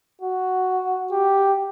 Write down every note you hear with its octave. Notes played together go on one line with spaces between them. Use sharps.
F#4
G4